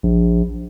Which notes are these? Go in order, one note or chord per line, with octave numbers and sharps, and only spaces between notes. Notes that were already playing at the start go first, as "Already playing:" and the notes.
A#1